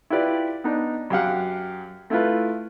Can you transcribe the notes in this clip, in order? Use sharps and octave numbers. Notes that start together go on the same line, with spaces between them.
E4 F4 G4 B4 D5
B3 D4 D#4
F#2 G4 F5 F#5
A3 E4 F4 B4